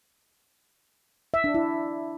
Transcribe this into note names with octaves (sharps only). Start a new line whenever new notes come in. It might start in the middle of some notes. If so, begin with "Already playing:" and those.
E5
D4
E4